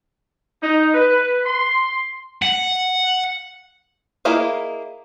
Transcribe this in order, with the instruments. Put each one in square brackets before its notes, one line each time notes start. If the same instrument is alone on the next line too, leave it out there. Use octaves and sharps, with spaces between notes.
[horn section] D#4
B4
C6
[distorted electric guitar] F#5
[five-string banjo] A#3 E4 G#4 D#5 F5